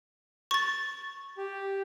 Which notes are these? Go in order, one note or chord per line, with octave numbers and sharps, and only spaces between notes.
C#6 A6
G4